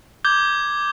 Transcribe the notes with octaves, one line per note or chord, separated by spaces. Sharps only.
D6 G6 G#6 G7